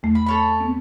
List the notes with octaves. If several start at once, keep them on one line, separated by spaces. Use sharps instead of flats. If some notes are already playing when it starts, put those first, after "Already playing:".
E2 A3
B5
A4 C#5 B5
B3 C4